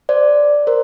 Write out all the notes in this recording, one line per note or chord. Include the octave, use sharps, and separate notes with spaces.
C5 D5
A#4 C5